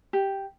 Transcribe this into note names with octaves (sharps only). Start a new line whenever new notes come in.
G4